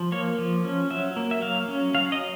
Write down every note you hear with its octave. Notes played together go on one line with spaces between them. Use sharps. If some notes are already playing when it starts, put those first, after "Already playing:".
Already playing: F3
A#3 C#5
F3
C#4
F#3 E5
A#3
E5
F#3 F5
C#4
F#3 F5
D#5